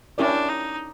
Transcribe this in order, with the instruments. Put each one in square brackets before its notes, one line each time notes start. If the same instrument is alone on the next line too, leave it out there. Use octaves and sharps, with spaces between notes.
[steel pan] C#4 E4 G4 A#4 D5 [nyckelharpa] D4
[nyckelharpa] D#4